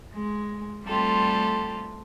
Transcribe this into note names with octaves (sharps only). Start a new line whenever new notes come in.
G#3
G3 A3 C4 F4 G4 A4